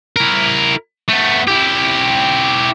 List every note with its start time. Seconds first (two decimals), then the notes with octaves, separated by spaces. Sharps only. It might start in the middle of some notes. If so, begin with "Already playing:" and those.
0.16 E4 A#4
1.08 A3 B3
1.48 E4 G4